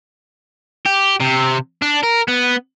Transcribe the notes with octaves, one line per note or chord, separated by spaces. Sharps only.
G4
C3
D4
A#4
B3